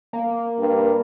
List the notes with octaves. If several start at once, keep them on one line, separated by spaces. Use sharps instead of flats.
A#3
G2